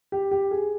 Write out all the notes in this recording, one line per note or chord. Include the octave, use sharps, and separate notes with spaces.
G4
G4
G#4